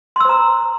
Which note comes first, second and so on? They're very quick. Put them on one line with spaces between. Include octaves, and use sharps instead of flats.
C6 E6 C5 A#5